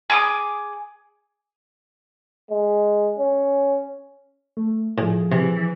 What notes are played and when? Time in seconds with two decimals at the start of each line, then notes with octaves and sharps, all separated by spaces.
0.10 G#4 D6 D#6
2.50 G#3
3.19 C#4
4.57 A3
4.98 A2 F3 G#4
5.32 C3 E3